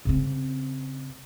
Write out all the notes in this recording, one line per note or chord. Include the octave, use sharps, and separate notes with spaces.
C#3 C4